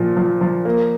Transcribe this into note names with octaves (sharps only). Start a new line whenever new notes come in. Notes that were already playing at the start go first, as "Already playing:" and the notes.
Already playing: A#2 F3
F3
F3
A#3